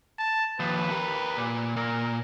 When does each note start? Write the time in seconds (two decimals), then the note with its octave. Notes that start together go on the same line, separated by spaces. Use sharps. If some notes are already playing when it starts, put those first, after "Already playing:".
0.19 A5
0.60 D#2 F3 B4
0.91 G4 A#4
1.37 A#2
1.76 A#2 A#4